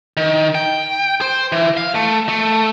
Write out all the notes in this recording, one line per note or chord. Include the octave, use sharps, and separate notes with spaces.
D#3
G5
C5
E3
F5
A3
A3